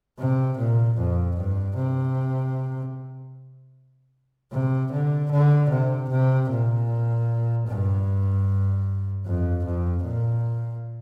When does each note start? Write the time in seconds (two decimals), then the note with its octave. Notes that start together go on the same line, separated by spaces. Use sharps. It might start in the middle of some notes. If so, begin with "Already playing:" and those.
0.19 C3
0.58 A#2
0.97 F2
1.37 G2
1.76 C3
4.52 C3
4.92 D3
5.31 D3
5.70 C3
6.09 C3
6.50 A#2
7.68 G2
9.26 F2
9.65 F2
10.04 A#2